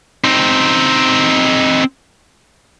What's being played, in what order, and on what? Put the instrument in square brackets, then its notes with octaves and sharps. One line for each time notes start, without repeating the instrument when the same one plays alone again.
[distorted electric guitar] C4 D#4